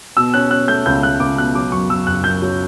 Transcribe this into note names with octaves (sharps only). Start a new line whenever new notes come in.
B2 E6
C#4 F#6
C#4 F#6
A3 G6
C#2 G6
A3 F#6
C#2 D6
B2 F#6
F#3 D6
F#2 C#6
F#2 E6
F#1 F#6
F#2 G6
F#3